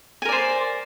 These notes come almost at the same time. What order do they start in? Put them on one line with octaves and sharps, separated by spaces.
G#5 A#4 D5 C5